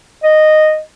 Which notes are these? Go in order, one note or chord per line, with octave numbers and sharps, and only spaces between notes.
D#5